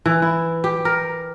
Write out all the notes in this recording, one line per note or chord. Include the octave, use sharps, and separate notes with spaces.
E3
E4
G4
A#4